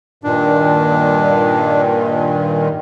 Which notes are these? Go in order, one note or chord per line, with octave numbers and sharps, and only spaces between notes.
G2 A#2 D#3 D4